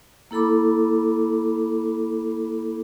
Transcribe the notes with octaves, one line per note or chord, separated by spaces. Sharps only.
A#3 E4 A4 B5 D6